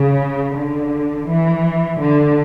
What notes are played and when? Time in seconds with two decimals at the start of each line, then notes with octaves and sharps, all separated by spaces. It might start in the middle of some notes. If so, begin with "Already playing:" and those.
Already playing: C#3
0.55 D3
1.28 E3
2.00 D3